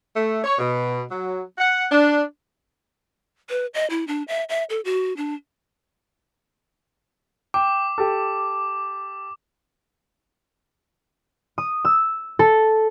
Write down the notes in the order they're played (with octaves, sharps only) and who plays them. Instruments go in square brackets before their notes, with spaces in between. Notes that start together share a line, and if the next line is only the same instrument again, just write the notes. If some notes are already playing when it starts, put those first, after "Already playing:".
[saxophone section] A3
C#5
B2
F#3
F#5
D4
[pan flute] B4
D#5
E4
D4
E5
E5
A4
F#4
D4
[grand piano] G5 [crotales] D6
[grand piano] G4 A4
[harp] D#6
E6
A4